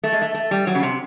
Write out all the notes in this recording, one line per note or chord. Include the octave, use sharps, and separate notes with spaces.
A3
G#3
A3
A3
G3
F#3
C#3
C3